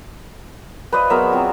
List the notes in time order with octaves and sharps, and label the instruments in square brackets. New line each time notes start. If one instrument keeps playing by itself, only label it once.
[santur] B4 D#5 [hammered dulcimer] C5 D5 F5
[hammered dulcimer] F#3 B3 G#4 [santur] A#4 E5
[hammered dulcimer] C4 F4